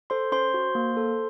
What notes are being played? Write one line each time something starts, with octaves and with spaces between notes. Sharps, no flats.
A4 C5 C6
C#4 C5 C6
F#4
A#3
A4